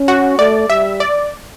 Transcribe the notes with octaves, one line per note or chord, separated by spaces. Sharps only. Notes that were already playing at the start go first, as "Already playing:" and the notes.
Already playing: C#4
F#4
A3 D5
G3 E5
D5